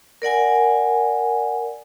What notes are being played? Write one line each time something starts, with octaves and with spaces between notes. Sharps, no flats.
A#4 D5 F#5 G#5